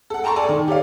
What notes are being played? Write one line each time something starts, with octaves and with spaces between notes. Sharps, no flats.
A4 F#5
G5 A5 A#5 C6 C#6
A4 D5 G#5
D#3
G4 C#5 D5 F5